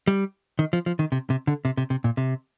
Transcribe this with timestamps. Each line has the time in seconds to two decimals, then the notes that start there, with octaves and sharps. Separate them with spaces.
0.07 G3
0.59 D#3
0.73 F3
0.86 F3
0.99 D#3
1.12 C3
1.30 C3
1.47 D3
1.65 C3
1.77 C3
1.90 C3
2.04 A#2
2.17 C3